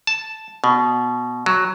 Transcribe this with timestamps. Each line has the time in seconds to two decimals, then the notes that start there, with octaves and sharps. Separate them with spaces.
0.07 A5
0.64 B2
1.46 F#3